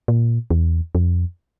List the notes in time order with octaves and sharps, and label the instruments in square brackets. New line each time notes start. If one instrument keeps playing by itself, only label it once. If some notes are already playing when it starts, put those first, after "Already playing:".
[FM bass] A#2
E2
F2